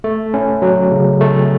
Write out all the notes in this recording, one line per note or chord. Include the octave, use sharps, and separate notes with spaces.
A3
C#4
F#3
C#3
A3